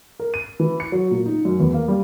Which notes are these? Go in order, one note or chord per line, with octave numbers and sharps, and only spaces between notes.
A#4
D#7
E3
C#7
F#3
A#2
D#4
F#2
E2
A#3
G3